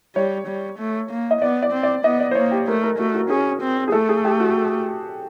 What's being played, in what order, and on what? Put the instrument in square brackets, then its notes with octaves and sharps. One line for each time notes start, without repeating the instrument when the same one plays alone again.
[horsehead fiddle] G3 [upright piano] C#5
[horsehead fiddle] G3
A3
A#3
[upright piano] D#5
[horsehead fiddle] B3 [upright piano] D5
[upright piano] D5
[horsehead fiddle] C4
[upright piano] D5
[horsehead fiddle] B3 [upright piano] D#5
[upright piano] D5
C5
[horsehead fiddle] A#3 [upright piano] C#5
[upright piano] G4
[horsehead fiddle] A3 [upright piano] A#4
[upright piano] A#4
[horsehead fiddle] A3 [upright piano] F#4
[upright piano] F#4
[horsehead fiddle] C#4 [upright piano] G#4
[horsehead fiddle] C4
[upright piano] G#4
[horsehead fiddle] A3 [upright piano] A4
[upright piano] G#4
G4
F#4